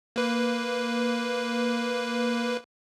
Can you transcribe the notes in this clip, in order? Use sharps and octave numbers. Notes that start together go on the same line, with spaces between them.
A#3 B4